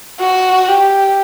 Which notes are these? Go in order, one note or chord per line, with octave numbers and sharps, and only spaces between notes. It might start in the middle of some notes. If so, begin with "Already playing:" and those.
F#4
G4